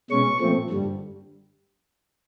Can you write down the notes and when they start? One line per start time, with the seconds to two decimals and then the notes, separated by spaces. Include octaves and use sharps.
0.10 B2 G#3 C#4 C#6
0.40 A#2 F3 A3 C4
0.70 G2 D3 G3